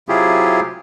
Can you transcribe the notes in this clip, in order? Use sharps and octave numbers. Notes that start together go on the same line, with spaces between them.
C3 F#3 E4 F4 G4 G#4